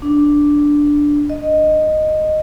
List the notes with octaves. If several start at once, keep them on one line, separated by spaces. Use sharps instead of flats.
D4
D#5